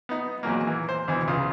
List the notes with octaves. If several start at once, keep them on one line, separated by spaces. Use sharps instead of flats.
B3 D#4
E2 A#2 F#3 A#3
E3
C5
D2 B2 E3
C#2 C#3 F4 D#6